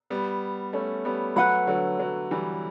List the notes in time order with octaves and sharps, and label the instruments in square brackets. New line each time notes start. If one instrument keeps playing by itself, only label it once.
[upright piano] G3 B3
A3 C#4
G3 B3
[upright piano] F#3 A3 [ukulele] B4 F#5 B5
[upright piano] D3 F#3
D3 F#3
E3 G3